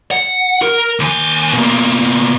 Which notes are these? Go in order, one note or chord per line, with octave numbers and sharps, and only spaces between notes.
F#5
A#4
D#2 G#5
B2 A#3